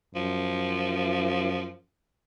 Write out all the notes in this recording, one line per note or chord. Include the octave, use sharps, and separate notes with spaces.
F#2 F3